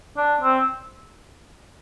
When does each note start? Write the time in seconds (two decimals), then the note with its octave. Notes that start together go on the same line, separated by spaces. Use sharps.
0.17 D4
0.41 C4